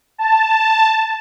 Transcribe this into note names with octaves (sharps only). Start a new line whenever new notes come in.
A5